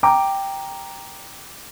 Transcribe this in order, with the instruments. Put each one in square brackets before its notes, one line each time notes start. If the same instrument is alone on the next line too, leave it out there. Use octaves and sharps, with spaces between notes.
[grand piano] G5 A#5 D6